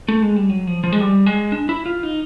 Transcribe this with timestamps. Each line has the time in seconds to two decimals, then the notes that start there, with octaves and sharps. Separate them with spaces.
0.08 A3
0.22 G#3
0.36 G3
0.49 F#3
0.67 F3
0.84 F3
0.93 G#3
1.01 G3
1.26 G#3
1.52 D4
1.69 E4
1.86 F4
2.03 D#4